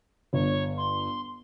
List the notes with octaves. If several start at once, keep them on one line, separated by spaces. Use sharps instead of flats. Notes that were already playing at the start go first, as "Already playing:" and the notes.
G1 C#5
C6